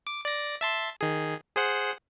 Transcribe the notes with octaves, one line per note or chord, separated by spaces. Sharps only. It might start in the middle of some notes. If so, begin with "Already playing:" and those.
D6
D5 A#6
E5 A5 C6
D#3 G#4
G#4 C5 F#5